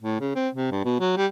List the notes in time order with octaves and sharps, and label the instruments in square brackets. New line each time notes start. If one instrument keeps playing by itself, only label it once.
[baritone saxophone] A2
C#3
C4
C3
G2
B2
F#3
G3